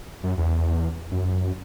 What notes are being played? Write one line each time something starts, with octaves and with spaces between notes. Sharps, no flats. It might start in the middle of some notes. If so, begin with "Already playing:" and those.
F#2
E2
F#2